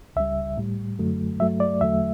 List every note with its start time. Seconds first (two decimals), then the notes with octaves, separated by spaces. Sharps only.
0.16 C#2 C#3 G3 E5
0.57 A2 G3
0.99 F#2 D3 F#3 A3
1.39 G2 F#3 A3 E5
1.60 D5
1.81 E2 D3 F#3 A3 E5